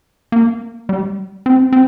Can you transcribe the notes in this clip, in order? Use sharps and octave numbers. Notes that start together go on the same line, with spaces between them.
A#3
G3
C4
C4